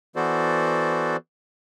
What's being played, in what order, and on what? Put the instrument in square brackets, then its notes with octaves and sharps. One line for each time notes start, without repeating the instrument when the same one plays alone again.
[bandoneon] E3 B3 F#4 A4 C5 D5